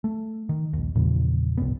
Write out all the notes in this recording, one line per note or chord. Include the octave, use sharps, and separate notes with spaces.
A3
D#3
A#1 D#2
E2 A#2 C#3 F3
G1 C2 G#2 B3